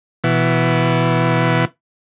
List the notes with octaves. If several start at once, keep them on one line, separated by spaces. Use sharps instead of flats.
B2 E3